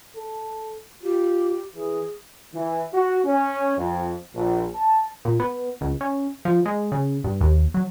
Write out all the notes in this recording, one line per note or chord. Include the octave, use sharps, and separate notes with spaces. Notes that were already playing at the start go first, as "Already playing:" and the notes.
A4
F4 G4
E3 G#4
E3
F#4
C#4
F2
A#1
A5
A#2
B3
C#2
C#4
F3
G#3
C#3
G2
D#2
F#3